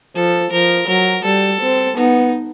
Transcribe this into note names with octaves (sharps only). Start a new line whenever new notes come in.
F3 A4
F3 A#4
F#3 A#4
G3 A4
C4
B3 D#4